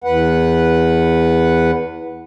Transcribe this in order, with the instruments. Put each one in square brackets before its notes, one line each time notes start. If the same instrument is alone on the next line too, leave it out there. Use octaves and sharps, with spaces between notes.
[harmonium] E2 B4 F#5